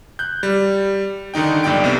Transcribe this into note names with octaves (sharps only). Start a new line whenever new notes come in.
F#6 G6
G3
D3 D#3 D#4 G5
B1 G2 A#2 D5 G5 D7
A#1 C3 B3